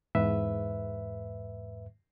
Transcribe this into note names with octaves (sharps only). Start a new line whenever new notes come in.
E2 G#2 B4 E5